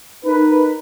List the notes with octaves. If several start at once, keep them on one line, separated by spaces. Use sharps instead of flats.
D#4 A#4 B4